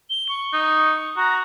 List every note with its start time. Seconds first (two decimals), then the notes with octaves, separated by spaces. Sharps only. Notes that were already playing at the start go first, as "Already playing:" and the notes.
0.10 G7
0.29 C#6
0.53 D#4
1.17 F#4 A#5